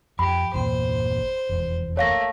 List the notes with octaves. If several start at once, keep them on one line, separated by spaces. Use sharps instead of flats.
F2 G4 B5
G1 E2 A#2 C5
F1 E2
A3 A#3 C#5 F5 A#6